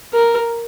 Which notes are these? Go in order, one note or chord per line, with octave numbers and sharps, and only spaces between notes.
A#4